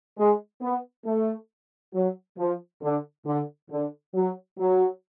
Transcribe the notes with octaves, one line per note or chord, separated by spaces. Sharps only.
G#3
B3
A3
F#3
F3
D3
D3
D3
F#3
F#3